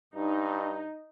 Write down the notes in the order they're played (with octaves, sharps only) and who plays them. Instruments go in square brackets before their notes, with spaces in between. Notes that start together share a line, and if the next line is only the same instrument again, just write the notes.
[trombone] G2 [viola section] D#4